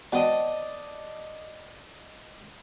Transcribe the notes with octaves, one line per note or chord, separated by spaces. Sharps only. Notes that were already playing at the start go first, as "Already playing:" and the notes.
B3 C4 F#4 D5 D#5 A5